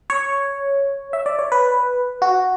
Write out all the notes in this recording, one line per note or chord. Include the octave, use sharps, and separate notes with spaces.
C#5
E5
D5
C#5
B4
F#4